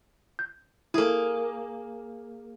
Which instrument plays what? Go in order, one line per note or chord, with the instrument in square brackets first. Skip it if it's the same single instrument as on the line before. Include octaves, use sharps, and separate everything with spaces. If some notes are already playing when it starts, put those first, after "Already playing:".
[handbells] G6
[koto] A#3 G#4 [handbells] E4 A4